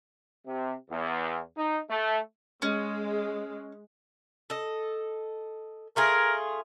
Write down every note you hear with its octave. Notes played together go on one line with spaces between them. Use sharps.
C3
E2
D#4
A3
G#3 C#4
A4 D#5
A3 F4 G#4 A#4